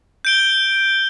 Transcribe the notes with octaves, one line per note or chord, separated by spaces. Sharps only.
G6 D7 G7